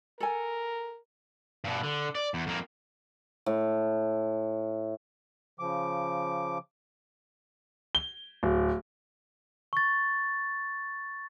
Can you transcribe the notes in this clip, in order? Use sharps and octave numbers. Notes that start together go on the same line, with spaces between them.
A4 A#4 G#5
G2 B2
D3
D5
E2
F2 A#3
A2
C#3 F3 D6
G7
D1
C#6 A6